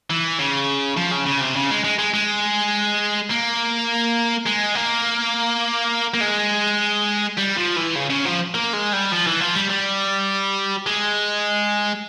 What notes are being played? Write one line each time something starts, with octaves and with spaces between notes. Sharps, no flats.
E3
C#3
F3
C#3
C#3
C3
C#3
G#3
G#3
G#3
G#3
A#3
G#3
A#3
A#3
G#3
G3
F3
E3
C#3
C#3
F3
A#3
G#3
G3
F3
E3
F3
G3
G3
G#3